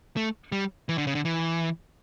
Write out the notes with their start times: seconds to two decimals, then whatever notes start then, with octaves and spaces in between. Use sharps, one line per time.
0.17 A3
0.52 G3
0.89 E3
0.98 D3
1.07 C#3
1.15 D3
1.25 E3